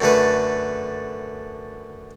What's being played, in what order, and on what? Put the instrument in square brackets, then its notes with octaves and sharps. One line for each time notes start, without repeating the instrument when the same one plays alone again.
[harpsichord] F#2 D3 A3 B4